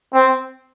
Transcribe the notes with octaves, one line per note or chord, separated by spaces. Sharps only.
C4